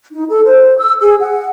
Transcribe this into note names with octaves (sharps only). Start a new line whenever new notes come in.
D#4
A4
C5
E6
G#4
F#5